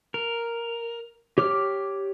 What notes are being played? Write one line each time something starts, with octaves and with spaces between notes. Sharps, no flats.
A#4
G4 C#5 D6 F6